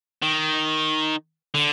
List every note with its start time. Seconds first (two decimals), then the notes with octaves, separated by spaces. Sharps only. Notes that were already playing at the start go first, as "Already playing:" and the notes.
0.22 D#3
1.54 D3